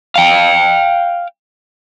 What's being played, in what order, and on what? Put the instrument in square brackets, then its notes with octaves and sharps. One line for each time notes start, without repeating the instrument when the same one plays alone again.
[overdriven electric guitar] F5 G5